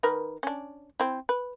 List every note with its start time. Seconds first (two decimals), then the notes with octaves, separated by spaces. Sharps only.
0.03 D#3 A#4 B4
0.43 C#4 D4
1.00 C4 E4
1.29 B4